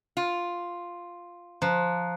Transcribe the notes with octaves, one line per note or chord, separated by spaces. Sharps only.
F4
F3 A#5 F#6